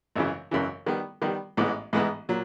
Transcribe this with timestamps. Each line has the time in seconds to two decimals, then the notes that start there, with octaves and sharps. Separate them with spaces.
0.16 G#1 F#2 C#3 E3
0.51 G#1 F#2 C#3 E3
0.86 D#3 G3 B3
1.22 D#3 G3 B3
1.57 A1 G#2 E3 G#3 B3
1.93 A1 G#2 E3 G#3 B3
2.29 A#2 F#3